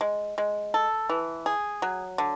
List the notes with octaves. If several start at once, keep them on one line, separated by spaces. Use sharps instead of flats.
G#3
G#3
A4
E3
G#4
F#3
D3